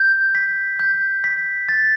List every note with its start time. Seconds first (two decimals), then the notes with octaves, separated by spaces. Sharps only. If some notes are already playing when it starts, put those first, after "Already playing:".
Already playing: G6
0.35 B6
0.79 G6
1.24 B6
1.69 A6